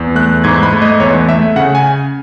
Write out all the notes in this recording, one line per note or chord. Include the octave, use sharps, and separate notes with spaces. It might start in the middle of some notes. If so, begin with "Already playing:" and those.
Already playing: E2
A3 F#6
G#2 G#6
B5
A3
D#5
E2 C#5
A3 E5
C#3 F#5
G#5